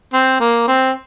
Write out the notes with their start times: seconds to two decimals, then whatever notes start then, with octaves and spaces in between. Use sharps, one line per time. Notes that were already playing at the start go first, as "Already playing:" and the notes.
0.13 C4
0.40 A#3
0.67 C4